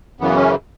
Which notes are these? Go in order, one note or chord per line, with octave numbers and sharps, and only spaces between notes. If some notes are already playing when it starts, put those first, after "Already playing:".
F#2 C#3 E3 B3
C#4